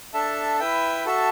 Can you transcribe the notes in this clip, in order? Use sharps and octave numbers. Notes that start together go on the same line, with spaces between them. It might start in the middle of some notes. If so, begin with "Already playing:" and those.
D4 A4 E5 A5
E4 B4 E5 G5
F#4 A4 E5 A5